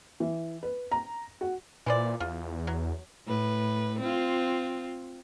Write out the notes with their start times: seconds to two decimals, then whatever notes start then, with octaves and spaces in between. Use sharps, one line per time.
0.20 E3
0.63 B4
0.92 A#5
1.41 F#4
1.86 A#2 E3 C5 D5
2.20 E2 F4
2.67 F#3
3.26 A2 B4
3.99 C4 F4